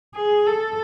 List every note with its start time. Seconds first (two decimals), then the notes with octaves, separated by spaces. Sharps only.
0.15 G#4
0.46 A4